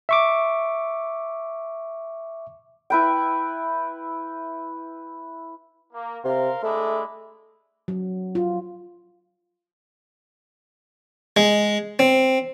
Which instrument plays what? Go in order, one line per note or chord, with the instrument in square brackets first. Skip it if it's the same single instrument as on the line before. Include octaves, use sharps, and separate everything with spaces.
[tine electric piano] E5 C#6 D6
[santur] E4 B4 G5
[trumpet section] A#3
[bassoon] C3 [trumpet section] A#4 F5 C6
[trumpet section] G#3 D4 E4 [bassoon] A3
[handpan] F#3
F4
[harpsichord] G#3
C4